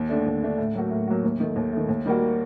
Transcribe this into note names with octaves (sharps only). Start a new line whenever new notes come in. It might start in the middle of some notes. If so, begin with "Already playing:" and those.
Already playing: D#2
D3 A3 D4
D#2
D3 A3 D4
A2
F#3 A#3 F#4
A2
F#3 A#3 F#4
D#2
D#3 A3
D#2
D#3 A3
D#2
D#3 G3 A#3 F#4